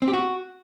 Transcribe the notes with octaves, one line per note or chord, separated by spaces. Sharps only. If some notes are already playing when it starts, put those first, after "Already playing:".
C4
G4
F#4